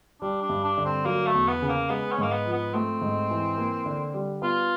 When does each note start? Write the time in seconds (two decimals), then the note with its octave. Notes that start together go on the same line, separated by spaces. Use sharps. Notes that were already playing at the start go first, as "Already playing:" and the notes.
0.21 G3 D4
0.42 D4
0.49 G2
0.64 D4
0.77 D3
0.85 C4
1.05 F#3 A#3
1.26 A3
1.34 E2
1.48 B3
1.62 C#3
1.68 A#3
1.89 G#3 B3
2.11 C#4
2.18 G#2 A#3
2.32 B3
2.46 F3
2.53 B3
2.74 A3 C4
3.01 G#2
3.31 E3
3.58 A#3
3.86 D3
4.14 G3
4.42 B3 F4